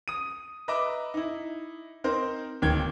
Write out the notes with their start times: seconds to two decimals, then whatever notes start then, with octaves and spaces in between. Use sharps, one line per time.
0.08 D#6 D#7
0.68 B4 D#5 E5 A#5 D6
1.14 D#4 E4
2.04 C4 D#4 A#4 C5
2.62 D1 D#3 A#3 D#4 G5 G#6